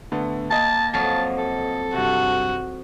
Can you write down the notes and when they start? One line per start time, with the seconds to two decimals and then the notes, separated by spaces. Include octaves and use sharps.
0.12 D3 A3 B3
0.50 A#3 D#5 A5
0.94 F2 F#3 F5 A5
1.38 A4
1.93 G2 C3 F#4